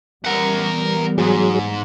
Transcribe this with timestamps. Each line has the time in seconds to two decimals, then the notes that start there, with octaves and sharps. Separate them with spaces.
0.25 E3 G3 B3 A#4 F#5
1.18 G#2 F#3 G#4